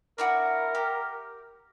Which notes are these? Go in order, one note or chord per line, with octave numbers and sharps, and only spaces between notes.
D4 E4 F#4 A#4
G4